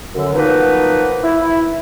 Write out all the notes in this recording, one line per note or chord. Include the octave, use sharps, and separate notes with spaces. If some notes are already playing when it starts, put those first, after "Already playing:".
F#2 D3
F3 F#3 A#3 B3 D#4 B4
E4